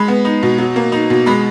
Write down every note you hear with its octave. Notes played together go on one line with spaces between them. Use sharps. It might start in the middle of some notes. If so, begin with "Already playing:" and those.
Already playing: G#3 B5
B3
D#4
B2
F#3
A#3
D#4
B2
G#3 B5